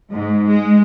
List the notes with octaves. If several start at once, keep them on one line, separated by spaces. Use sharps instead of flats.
G#2
G#3